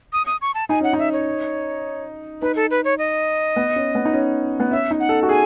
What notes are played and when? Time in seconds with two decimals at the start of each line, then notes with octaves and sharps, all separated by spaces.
0.13 D#6
0.27 D#6
0.41 C#6
0.55 A5
0.69 D#4 G#5
0.81 C#4 F#5
0.93 D#4
0.99 E5
1.13 C#5
2.42 D#4 B4
2.56 A4
2.71 B4
2.84 C#5
2.99 D#5
3.56 B3
3.76 C#4
3.95 B3
4.05 D#4
4.13 C#4
4.60 B3
4.71 C#4 E5
4.91 D#4
5.00 F#5
5.09 A4
5.23 F#4
5.29 G#4 G#5